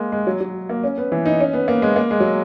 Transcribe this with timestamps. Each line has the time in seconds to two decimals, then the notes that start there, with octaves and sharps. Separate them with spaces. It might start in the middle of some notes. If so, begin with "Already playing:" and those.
Already playing: G#3 A#3
0.12 G#3
0.27 F#3
0.41 F#3
0.69 A#3
0.84 C#4
0.98 B3
1.12 E3
1.26 D#4
1.40 C#4
1.53 B3
1.68 A#3
1.82 G#3
1.96 A#3
2.11 G#3
2.20 F#3